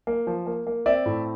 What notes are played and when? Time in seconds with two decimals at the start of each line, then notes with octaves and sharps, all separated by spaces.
0.07 A#3
0.27 F3
0.47 A#3
0.67 A#3
0.86 C4 D5 E5
1.06 A2